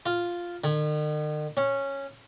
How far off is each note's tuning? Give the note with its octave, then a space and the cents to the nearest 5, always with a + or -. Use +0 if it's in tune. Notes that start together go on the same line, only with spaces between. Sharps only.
F4 +0
D#3 -45
C#4 -10